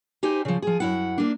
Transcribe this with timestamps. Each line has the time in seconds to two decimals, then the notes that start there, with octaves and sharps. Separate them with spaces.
0.23 D#4 G4 C5 G#5
0.45 C#3 F3
0.62 F3 G#4
0.80 F#2 E4 F#5
1.18 A#3 D4